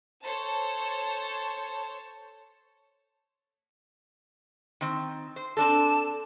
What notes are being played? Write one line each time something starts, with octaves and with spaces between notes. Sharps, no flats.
A4 C5 C#5 A5
D#3 C4
C5
C4 D4 A4 A5